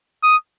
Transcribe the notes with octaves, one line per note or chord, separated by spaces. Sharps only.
D#6